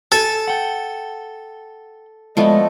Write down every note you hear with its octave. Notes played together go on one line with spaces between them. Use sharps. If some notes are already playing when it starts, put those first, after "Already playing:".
A4 G#5 A5
F#5 G5
F3 G#3 A3 B3 D5 D#5